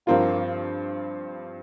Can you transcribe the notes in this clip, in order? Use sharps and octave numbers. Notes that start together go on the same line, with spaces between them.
G2 F3 A#3 C4 F4